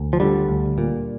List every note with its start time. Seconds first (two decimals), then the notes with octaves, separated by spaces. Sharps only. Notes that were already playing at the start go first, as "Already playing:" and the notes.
Already playing: D2
0.13 F3
0.20 D3 G3
0.48 D2
0.78 A#2